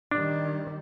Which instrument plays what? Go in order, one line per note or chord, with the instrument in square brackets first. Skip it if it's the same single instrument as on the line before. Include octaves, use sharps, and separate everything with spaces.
[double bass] D#3 G3 [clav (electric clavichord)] D4